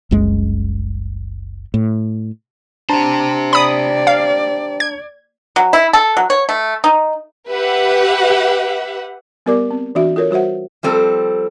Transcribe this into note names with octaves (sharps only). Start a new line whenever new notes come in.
F#1 C2 F#2 G#3
A2
D4 G4 C5 A5 A#5
D5 B5 D#6
F5
G#6
F#3
E4
A4
F#3
C#5
A3
D#4
G4 B4 E5 F#5
G3 B3 G4 A#4 D5 D6
C4
E3 D4 F#4 E5
F4 A4 A#4 C#5
G3 F#4 C5 E5 F#5
F3 G3 C4 A4